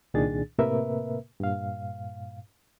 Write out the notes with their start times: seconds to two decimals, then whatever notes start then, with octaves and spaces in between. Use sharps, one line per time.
0.14 C2 A#2 D#3 D4 G#4 A6
0.59 A2 C3 A#3 A#4 B4 E5
1.40 G2 A#2 F5